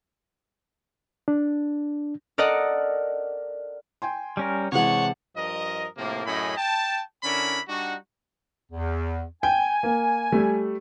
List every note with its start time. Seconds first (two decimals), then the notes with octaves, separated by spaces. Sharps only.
1.28 D4
2.38 A4 A#4 D5 D#5 F#5
4.02 G5 G#5 C6
4.37 G3 C#4 A#4
4.72 C3 E3 G#3 C#5 F#5 A5
5.36 G2 F3 A#4 D#5
5.97 A2 C3 F3 A#3
6.26 F#2 A2 C#4 G#4 D#5 B5
6.57 G5 A5
7.23 D3 C#4 D4 E4 A#4 B5
7.68 G3 D4 D#4 F#4
8.72 E2
9.43 G5 G#5
9.83 A#3
10.32 G3 A3